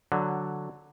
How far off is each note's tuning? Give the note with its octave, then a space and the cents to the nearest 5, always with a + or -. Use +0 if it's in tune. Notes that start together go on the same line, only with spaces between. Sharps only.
D3 +0 F#3 +0